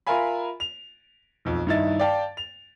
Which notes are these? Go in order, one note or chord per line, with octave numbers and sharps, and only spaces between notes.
F4 A#4 E5 F5 G#5 B5
F7
B1 F2
G2 D#3 D#4 E4 A6
D5 F5 G5 A5
F7